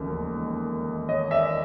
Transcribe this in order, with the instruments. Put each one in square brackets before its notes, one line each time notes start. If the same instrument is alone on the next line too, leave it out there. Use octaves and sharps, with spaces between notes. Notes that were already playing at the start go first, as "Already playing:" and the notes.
Already playing: [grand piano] E1 D#2 C#3 F3 A3
C#5 D#5
D5 E5